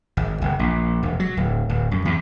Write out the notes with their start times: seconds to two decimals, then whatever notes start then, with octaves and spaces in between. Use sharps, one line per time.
0.17 G#1
0.42 F#1
0.59 A#1
1.03 E1
1.20 F#3
1.37 D1
1.69 D1
1.91 F#2
2.05 E2